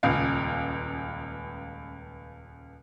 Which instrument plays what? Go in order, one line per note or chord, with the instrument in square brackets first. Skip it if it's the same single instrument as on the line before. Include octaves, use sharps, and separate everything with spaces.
[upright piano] D#1 C#2 F5